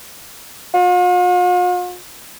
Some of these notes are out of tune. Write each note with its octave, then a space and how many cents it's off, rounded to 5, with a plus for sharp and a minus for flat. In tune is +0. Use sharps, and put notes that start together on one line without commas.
F4 +45